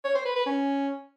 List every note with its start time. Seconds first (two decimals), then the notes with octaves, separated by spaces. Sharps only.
0.04 C#5
0.15 C5
0.25 B4
0.35 B4
0.46 C#4